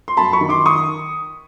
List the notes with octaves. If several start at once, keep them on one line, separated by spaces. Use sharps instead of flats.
C6
F#2 A5 B5
B5 C#6
D#3
C6 D6
C#6 D#6